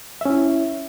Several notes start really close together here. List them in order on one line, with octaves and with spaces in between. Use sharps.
E5 C#4 E4